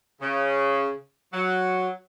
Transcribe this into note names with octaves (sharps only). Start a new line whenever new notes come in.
C#3
F#3